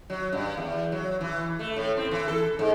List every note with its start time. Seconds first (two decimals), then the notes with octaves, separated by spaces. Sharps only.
0.10 F#3
0.32 G2
0.57 E2
0.92 F#3
1.21 E3
1.59 A3
1.76 A2
1.97 C4
2.11 E3
2.28 A4
2.59 G#2